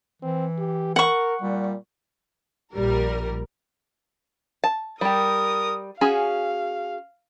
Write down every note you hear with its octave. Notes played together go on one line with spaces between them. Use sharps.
E3 C4
G4
A#4 F#5 C#6
A#2 G3
A#1 G3 A#4
A5
G3 G4 A#4 D#6
C#4 F#4 G#4 F5